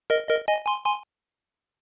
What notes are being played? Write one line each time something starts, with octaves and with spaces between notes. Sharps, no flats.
A#4 D#5
A#4 D#5
D#5 G#5
G#5 C6
G#5 C6